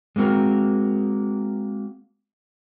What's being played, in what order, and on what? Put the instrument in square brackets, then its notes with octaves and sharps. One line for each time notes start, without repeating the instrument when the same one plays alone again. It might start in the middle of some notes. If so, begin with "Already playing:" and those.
[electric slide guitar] G#3 A#3 C4 F#4 A#4